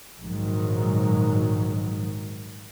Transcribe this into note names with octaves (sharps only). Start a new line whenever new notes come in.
A#1 G#2 D#3 F#3